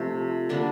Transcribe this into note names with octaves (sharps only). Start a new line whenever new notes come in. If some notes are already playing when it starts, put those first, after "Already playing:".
Already playing: C3 F3 A3 A4
D3 G3 A#3 D4